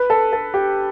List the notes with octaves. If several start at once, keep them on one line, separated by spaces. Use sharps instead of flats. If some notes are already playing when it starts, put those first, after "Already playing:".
Already playing: B4
A4
A4
G4